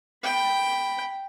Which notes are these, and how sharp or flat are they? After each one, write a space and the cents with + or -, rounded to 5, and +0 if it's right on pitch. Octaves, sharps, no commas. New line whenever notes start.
G5 +0 B5 +0